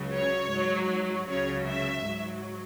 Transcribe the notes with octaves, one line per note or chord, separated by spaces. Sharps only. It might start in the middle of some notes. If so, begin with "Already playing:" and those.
Already playing: C#2 C#3 F#3
C#5
G#2 F#3
C#2 C#3 F#3 C#5
E5
G#2 F#3